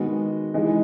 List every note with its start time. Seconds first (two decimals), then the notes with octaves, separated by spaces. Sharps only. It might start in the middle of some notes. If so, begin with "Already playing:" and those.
Already playing: D#3 G#3 B3 F#4
0.54 E3 G#3 D#4 G#4